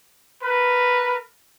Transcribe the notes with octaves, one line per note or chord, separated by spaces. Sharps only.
A#4 B4